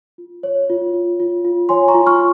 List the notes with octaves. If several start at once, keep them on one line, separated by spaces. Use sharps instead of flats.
F4
C#5
F4
F4
F4
F4
C#5 G#5 C6
A#5 C#6
F4
C#6 F6